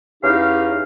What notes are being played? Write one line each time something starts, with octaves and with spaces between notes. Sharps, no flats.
E2 C#4 D#4 G4 F5